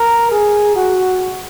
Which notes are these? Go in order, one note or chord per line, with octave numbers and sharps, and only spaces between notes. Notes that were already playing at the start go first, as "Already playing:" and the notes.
Already playing: A#4
G#4
F#4